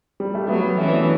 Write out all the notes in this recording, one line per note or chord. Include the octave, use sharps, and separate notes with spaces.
G3
A3
F#3 G3 B3
E3 A3 C#4
B3 D4
C#4 E4